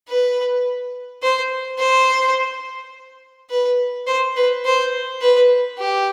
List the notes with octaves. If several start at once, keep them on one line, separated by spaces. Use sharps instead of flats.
B4
C5
C5
B4
C5
B4
C5
B4
G4